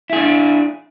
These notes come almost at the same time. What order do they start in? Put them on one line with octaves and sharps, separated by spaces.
E4 G#4 D4